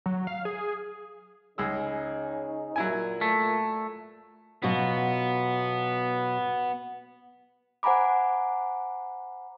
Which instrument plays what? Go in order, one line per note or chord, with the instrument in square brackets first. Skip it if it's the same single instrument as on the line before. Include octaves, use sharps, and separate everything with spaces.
[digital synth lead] F#3
F5
G#4
[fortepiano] C#2 G#4 E6 [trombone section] C#3 C#4 D#4
[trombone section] A#2 [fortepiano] F#3 E4 G#5
[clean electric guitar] A3
[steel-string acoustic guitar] B2 F#3 F4 [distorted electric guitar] B3
[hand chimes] C5 F#5 G#5 A#5 B5 D6